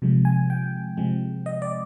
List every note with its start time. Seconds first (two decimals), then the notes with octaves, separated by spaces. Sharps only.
0.02 C3 F3 G#3
0.25 G#5
0.50 G5
0.97 C3 F3 G#3
1.46 D#5
1.62 D5